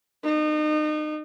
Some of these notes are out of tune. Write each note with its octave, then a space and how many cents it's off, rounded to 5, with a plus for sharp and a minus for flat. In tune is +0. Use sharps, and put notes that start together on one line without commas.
D#4 -35